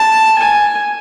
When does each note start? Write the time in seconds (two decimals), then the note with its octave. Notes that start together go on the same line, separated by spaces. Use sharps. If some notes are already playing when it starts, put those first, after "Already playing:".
Already playing: A5
0.38 G#5